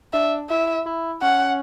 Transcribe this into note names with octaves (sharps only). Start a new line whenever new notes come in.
D4 E5
E4 E5
E4
C#4 F#5